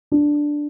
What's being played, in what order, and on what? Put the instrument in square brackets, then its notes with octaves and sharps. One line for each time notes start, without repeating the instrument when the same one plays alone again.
[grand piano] D4